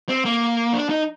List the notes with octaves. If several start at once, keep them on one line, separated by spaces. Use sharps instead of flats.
C4
A#3
D4
D#4